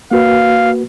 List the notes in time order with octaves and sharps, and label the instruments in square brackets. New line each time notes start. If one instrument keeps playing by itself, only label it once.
[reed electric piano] A#3 F#4 B4 [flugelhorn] F5